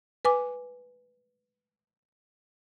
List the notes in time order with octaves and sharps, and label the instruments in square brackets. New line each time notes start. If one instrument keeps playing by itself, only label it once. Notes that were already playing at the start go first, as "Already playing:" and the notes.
[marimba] B4 G#5 D6